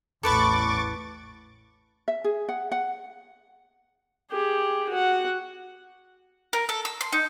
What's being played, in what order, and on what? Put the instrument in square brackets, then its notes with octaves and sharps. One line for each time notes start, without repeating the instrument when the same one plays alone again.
[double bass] A1 E2 [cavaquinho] A4 B4 B5 [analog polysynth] C#6 D6 A6
[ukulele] E5
G#4
F#5
F#5
[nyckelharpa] G4 G#4
F#4 F#5
[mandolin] A#4
A4
E6
C6
D#4